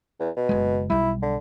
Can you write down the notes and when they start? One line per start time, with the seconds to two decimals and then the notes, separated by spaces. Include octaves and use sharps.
0.20 E2
0.37 B2
0.49 F#1 G#3
0.90 B1 G3 E4
1.22 D3